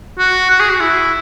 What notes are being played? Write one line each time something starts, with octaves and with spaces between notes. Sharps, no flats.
F#4
F#4
G#4
F#4
E4